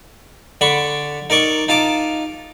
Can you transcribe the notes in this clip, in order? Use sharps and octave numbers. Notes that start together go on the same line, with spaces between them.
D3 D4 B5 C#6
D#4 A#4 D5 C#6
D#4 F4 A5 A#5 D6